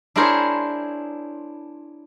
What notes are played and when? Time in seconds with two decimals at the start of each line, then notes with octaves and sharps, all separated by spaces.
0.16 D4 E4 G#4 A#4 C5 C#5